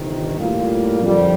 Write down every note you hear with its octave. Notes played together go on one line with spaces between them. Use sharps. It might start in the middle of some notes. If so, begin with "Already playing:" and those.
Already playing: G1 F2 C3 D#3
A2 G3 A#3 F4
F2 D3 G3